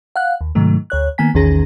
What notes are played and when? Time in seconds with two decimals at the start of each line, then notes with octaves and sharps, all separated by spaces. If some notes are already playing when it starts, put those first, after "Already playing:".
0.16 F5 F#5 F#6
0.41 D#2
0.55 G#2 C3 D#3 F#3 A3
0.90 D2 C#5 F#6
1.18 D#3 A#3 B3 G#5 B6
1.34 A#1 E2 D#3 C#4 G#4 A#6